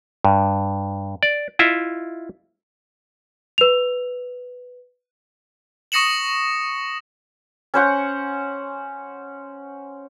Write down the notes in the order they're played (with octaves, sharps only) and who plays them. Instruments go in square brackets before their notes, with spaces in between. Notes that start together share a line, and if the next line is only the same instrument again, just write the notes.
[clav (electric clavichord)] G2
D5
E4 F4 D#5 E5
[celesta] B4 F7
[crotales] C#6 D#6 A#6 C#7 E7 F#7
[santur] C#4 C5 F#5